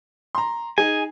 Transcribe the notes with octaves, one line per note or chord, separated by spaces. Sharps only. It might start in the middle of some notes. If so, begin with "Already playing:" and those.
A#5 C6
D#4 G#4 G#5